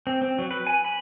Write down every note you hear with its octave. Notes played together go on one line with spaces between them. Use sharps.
C4
C4
F#3
B4
G#5
B5